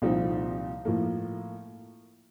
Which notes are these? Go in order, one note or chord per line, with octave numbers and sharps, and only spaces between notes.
C2 A#2 F3 C4 D#4
A2 F3 A#3